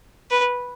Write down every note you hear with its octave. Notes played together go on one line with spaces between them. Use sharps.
B4